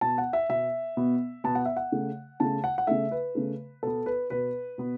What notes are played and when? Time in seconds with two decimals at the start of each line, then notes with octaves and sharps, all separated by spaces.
0.01 B2 B3 A5
0.18 F#5
0.33 E5
0.49 B2 B3 E5
0.97 B2 B3
1.44 B2 B3 A5
1.55 F#5
1.65 E5
1.77 F#5
1.92 C#3 A3
2.40 C#3 A3 A5
2.64 F#5
2.78 F#5
2.87 C#3 A3 E5
3.11 B4
3.35 C#3 A3
3.83 B2 B3 A4
4.06 B4
4.30 B2 B3 B4
4.78 B2 B3